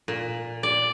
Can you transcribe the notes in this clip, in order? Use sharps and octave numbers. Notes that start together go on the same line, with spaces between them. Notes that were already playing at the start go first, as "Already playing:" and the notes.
A#2
D5